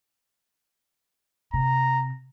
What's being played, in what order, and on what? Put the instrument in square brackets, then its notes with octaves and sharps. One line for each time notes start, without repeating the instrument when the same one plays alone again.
[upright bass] C3 [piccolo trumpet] A#5